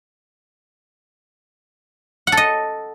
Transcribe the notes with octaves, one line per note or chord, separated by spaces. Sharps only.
F#5
A4
D#5